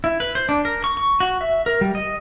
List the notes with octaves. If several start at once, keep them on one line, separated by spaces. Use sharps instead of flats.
E4
B4
C5
D4
A#4
C#6
C#6
F#4
E5
A#4
G3
D#5